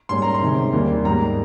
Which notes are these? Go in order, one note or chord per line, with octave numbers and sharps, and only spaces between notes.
G#2 G3 A#3 C#4 C6
A#5
C6
C3 D#3 G#3 C#4
D#2 D#3 G3 A#3 C#4
G#2 G3 A#3 A#5